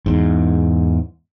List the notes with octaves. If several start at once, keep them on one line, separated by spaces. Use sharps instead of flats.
E2 G#2